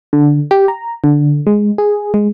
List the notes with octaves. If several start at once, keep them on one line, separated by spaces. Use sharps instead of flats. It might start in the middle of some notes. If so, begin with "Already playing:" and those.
D3
G4
A#5
D3
G#3
G#4
G#3